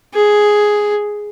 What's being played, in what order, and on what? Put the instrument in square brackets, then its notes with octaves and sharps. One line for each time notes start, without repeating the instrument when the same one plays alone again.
[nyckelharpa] G#4